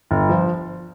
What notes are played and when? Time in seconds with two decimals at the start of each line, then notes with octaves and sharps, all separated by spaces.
0.11 G1
0.29 F3